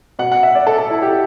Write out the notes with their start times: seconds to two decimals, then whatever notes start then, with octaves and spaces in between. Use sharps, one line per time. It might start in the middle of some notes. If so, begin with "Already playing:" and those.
0.19 B2 F#5
0.32 F#5
0.43 E5
0.55 D5
0.67 A4
0.78 A4
0.90 E4
1.02 G4